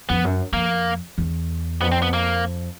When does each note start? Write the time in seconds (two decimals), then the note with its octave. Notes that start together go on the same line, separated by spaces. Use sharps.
0.09 F2 B3
0.24 F#2
0.52 F2 A#3
1.18 E2
1.81 F2 B3
1.92 C4
2.02 B3
2.13 A#3